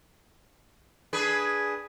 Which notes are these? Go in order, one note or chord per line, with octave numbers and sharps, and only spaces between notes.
D4 G#4 B4